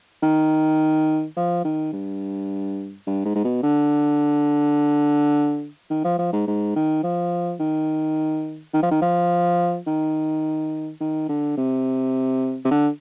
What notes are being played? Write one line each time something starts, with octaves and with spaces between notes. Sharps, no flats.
D#3
F3
D#3
G2
G2
G#2
G#2
B2
D3
D#3
F3
F3
G#2
G#2
D#3
F3
D#3
D#3
F3
D#3
F3
D#3
D#3
D3
C3
C3
D3